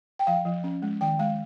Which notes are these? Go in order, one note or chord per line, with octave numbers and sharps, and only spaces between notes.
G5
F3 F5
F3
C#4
G#3
D#3 G5
G#3 F5